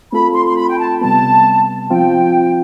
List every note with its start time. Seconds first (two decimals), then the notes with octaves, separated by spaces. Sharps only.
0.12 A3 C4 F4 A4 B5
0.35 C6
0.46 C6
0.57 B5
0.69 G5
0.79 A5
1.01 C3 G3 B3 A5
1.91 F3 C4 F4 G5